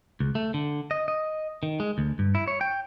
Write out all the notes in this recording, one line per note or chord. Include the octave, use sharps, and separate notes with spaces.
C#2
A3
D3
D#5
D#5
D#3
G#3
D2
G2
E4
C#5
G5